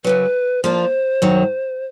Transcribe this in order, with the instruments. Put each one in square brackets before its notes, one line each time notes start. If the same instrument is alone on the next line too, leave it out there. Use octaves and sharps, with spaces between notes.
[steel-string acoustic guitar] F#2 C#3 F#3 [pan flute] B4
[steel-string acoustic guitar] F3 A#3 D4 [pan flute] C5
[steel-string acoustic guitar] F#2 D#3 F#3